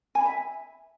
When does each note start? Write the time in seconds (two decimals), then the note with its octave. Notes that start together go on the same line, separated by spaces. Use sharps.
0.15 G#5
0.20 B5
0.26 E5